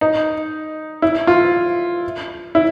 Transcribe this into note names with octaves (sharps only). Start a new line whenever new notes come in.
D#4
E4
F4
E4